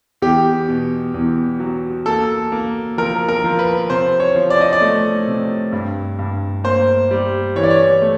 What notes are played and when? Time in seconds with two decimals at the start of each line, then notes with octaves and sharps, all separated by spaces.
0.22 E2 G4
0.68 B2
1.14 E2
1.60 F#3
2.06 A#3 A4
2.52 A#3
2.97 F3 A#4
3.29 A#4
3.44 F3
3.59 B4
3.90 C3 C5
4.20 C#5
4.35 F3
4.50 D5
4.61 D#5
4.73 D5
4.82 A3
5.27 C3
5.72 G2
6.19 G2
6.64 A#3 C5
7.11 G3
7.56 E3 C#5
7.63 D5
7.70 C#5
8.02 A3